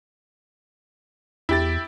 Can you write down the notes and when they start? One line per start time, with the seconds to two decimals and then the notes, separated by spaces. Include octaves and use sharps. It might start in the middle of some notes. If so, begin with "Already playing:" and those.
1.49 E2 E4 G4 A6